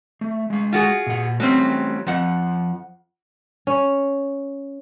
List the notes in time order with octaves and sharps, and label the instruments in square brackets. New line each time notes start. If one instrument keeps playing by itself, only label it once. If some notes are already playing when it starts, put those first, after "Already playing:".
[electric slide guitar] A3
G#3 F5
[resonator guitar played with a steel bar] F4 F#4 G#4
[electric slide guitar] A#2 F#5
[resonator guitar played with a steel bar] F#3 G3 C4 [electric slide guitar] A3 C#4
[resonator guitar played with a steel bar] F2 F#5 [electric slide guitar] F3 F4
[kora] C#4